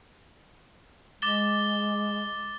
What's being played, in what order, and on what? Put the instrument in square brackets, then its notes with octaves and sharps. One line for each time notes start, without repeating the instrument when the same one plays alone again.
[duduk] G#3 [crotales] D6 A6 G7